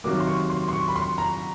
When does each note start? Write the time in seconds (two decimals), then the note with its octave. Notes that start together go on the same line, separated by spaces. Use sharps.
0.04 C3 D#3 F#3 A#3 D6
0.20 C6
0.27 C#6
0.50 C6
0.68 C6
0.73 C#6
0.88 B5
0.96 C6
1.18 A#5